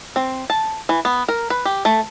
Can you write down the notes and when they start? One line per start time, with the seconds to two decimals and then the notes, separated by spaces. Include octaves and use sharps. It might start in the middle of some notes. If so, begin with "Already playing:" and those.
0.16 C4
0.50 A5
0.89 E3
1.05 B3
1.29 A#4
1.50 B4
1.65 G4
1.85 A3